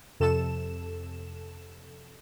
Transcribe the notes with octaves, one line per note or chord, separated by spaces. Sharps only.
F2 C3 A4 E7